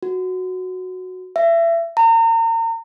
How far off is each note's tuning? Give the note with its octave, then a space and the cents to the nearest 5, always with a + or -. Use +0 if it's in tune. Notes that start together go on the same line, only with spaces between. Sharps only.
F#4 -5
E5 +30
A#5 -35